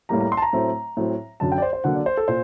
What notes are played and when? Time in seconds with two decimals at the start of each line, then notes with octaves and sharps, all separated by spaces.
0.09 A2 G3 A#3 A#5
0.21 A#5
0.32 C6
0.37 A5
0.42 A#5
0.53 A2 F#3 A3 C4
0.97 A2 F#3 C4
1.40 F#2 D3 F#3 A5
1.52 G5
1.58 D5
1.62 C5
1.73 C5
1.84 D3 F#3 A#3 F#5
1.95 D5
2.06 C5
2.17 A4
2.28 A#2 C5